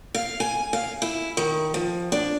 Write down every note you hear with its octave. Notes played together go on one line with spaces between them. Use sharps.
F5
G#5
F5
E4
D#3
F3
D4